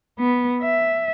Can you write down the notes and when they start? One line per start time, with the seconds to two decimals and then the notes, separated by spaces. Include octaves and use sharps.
0.19 B3
0.62 E5